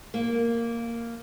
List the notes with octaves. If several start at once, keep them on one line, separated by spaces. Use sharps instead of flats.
A#3